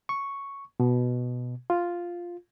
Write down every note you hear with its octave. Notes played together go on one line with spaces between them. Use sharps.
C#6
B2
F4